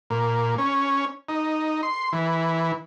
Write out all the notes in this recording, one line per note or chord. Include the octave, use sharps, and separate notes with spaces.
A#2
C#4
D#4
C6
E3